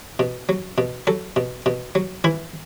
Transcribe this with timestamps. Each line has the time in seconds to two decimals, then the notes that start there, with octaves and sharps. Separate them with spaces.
0.19 B2
0.49 F#3
0.78 B2
1.07 F#3 A4
1.36 B2
1.66 B2
1.95 F#3
2.24 E3 E4